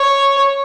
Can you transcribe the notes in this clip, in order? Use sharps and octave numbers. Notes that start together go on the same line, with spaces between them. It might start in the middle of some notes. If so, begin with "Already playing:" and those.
Already playing: C#5